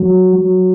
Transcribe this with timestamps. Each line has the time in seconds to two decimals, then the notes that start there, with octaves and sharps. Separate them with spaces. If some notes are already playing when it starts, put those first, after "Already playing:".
Already playing: F#3
0.36 F#3